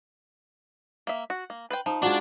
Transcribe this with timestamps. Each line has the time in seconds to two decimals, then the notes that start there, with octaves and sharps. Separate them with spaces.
1.07 A#3 E5
1.30 F#4
1.50 A#3
1.71 B4 C5 G5
1.86 F3 D#4
2.03 G#3 D4 F4 F#4